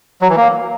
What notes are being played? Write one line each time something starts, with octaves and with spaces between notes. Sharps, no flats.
F#3
E3
A#3